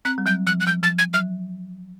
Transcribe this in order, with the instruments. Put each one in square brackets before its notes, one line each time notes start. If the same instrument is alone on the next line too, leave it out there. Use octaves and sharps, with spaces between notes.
[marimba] C4 [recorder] F#6
[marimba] G3
[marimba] F#3 [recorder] G6
[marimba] F3 [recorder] F#6
[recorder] F#6
[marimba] F3 [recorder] G6
[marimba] F3 [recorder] A6
[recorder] G#6
[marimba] F#3 [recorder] F6